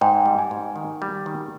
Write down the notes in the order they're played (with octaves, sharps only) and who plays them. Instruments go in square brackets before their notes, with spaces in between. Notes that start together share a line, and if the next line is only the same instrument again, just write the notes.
[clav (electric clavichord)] G#2 [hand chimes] G5
[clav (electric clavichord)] G3
[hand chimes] G#5
[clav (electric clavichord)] G#2
D#3
G3
D#3